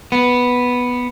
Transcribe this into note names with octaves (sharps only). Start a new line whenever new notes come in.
B3